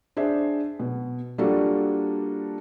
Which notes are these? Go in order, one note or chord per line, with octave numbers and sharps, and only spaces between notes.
D4 G#4 C5 E5
B2
G3 A#3 D4 F4 F#4 A4